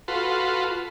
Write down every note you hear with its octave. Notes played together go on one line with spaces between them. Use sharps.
F4 F#4 A4 B4 C6